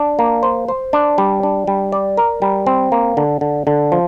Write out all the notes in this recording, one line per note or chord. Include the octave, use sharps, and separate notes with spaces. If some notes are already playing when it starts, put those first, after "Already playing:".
Already playing: D4
A#3
C5
C5
D4
G3
D4
G3
D5
A#4
G3
C4
A#3
D3
D3
D3
F3